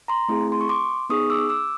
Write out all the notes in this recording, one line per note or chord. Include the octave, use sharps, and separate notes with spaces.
A#5 C6
A3 C4 E4 G#4
C6
C#6
C6 D6
B3 D#4 G#4 C#6 D#6
D6 E6
D6 E6